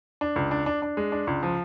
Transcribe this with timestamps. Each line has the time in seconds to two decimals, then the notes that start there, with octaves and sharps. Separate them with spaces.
0.21 D4
0.36 C#2
0.51 D4
0.66 D4
0.82 D4
0.97 G#3
1.12 D4
1.27 C#2
1.43 F3